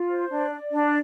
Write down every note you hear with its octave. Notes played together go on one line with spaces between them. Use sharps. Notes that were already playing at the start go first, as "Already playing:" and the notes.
Already playing: F4
C5
D4
D5
D4